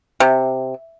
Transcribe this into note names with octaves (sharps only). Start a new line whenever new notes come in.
C3